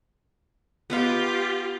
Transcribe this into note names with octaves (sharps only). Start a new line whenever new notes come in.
B3 F4 G4 B4 F5